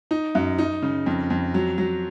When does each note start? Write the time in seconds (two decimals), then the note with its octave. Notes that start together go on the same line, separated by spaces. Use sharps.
0.11 D#4
0.35 F#2
0.58 D#4
0.82 C#3
1.06 F2
1.30 F2
1.54 F#3
1.78 F#3